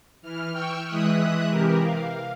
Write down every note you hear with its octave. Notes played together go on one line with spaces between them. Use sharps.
E3 F6
G5 C#6 E6 F6
E3 G#3 E5 D#6 F#6
C3 E3 G4 A#4
F5